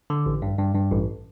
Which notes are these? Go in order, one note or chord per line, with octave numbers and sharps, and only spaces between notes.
D3
A1
G2
G2
G2
A1